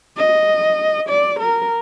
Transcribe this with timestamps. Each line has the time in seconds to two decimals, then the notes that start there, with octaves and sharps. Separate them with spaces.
0.17 D#5
1.09 D5
1.39 A#4